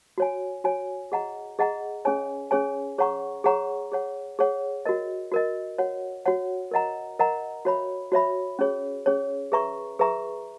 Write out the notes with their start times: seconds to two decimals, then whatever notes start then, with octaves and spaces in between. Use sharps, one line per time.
0.18 F#4 C#5 G#5
0.64 F#4 C#5 G#5
1.12 G#4 D#5 F#5 A#5
1.59 G#4 D#5 F#5 A#5
2.05 C#4 G#4 C#5 G#5
2.51 C#4 G#4 C#5 G#5
2.98 G#4 C#5 F#5 A#5 C#6
3.44 G#4 C#5 F#5 A#5 C#6
3.92 G#4 C#5 F#5
4.39 G#4 C#5 F#5
4.86 F#4 A#4 D#5
5.31 F#4 A#4 D#5
5.78 F#4 C#5 F#5
6.25 F#4 C#5 F#5
6.71 A#4 D#5 F#5 A#5
7.19 A#4 D#5 F#5 A#5
7.65 F#4 C#5 E5 B5
8.12 F#4 C#5 E5 B5
8.59 C#4 G#4 C#5
9.06 C#4 G#4 C#5
9.52 G#4 B4 E5 A#5 C#6
9.99 G#4 B4 E5 A#5 C#6